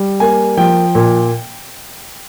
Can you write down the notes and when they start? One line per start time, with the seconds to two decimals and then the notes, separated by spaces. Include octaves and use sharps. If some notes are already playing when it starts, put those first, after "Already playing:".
Already playing: G3
0.20 A#3 G#5
0.57 F3 G5
0.95 A#2